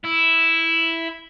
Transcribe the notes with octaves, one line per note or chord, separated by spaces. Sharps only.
E4